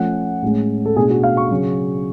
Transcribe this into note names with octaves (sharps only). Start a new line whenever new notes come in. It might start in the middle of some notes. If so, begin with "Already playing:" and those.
Already playing: F3 A3 C#4 F#5
A2 G#3 C#4
A4
B2 A3 D4 G#4
F#4
F5
C#6
C#3 F#3 C#4